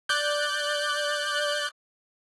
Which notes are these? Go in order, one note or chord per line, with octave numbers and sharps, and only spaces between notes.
D5 F#6 G6